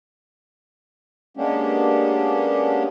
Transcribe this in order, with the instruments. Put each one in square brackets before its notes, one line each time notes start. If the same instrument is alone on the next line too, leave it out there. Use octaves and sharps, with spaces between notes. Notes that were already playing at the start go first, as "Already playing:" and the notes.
[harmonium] G#3 A#3 B3 C#4 D4 G4